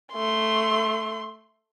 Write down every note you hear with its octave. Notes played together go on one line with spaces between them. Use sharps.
A3 C6